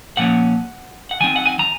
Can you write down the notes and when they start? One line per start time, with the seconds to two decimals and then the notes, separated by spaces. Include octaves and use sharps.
0.17 A#2 F3 A#3 C#4 F#5
1.11 F#5
1.20 D#3 F#3 C4 G#5
1.36 F#5
1.46 G#5
1.59 A#5